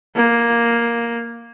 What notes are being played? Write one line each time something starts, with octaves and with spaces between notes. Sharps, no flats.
A#3